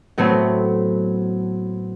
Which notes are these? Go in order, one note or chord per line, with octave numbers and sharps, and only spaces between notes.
A2 F#3 A3 B3 C4